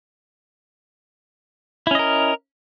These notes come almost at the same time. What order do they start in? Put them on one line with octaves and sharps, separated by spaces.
E4 C#4 D#5 A#4